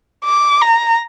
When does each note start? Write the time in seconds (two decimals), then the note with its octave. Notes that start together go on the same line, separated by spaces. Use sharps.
0.25 D6
0.62 A#5